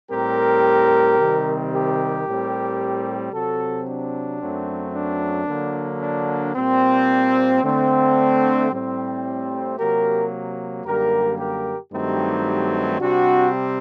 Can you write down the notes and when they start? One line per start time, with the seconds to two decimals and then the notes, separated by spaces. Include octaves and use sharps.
0.10 A2 G3 C4 G4 A#4
1.18 C3 D#3 G3 C4
1.71 G4 A#4
2.26 A2 G3 C4
3.32 C3 F#3 C4 F#4 A4
3.87 D4
4.40 F#2 F#3 A3 C4
4.93 D4
5.47 D3 F#3 A#3
6.01 D4
6.55 A#2 G3 A#3 C4
7.63 D3 A3 C4
8.70 A2 G3 C4
9.77 C3 F#3 A#3 G4 A#4
10.84 F#2 D3 G3 A#3 G4 A#4
11.39 G4 A#4
11.91 G2 D#3 F#3 A3 C4 D#4 G4
12.99 C3 G3 C4 D4 F#4